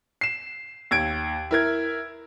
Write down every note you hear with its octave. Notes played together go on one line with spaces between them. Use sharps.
C7 E7
D#2 G#6 D7
E4 A#4 G#6